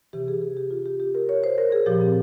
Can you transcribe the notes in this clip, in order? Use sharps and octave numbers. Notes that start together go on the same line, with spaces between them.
C3 E3 G4
G#4
G#4
G4
F4
G4
G4
A#4
C#5
C5
A#4
G#4
A#2 F3 G4
C4